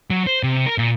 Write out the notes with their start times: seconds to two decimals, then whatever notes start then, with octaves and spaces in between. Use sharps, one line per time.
0.10 F#3
0.27 C5
0.43 C3
0.66 A#4
0.78 A#2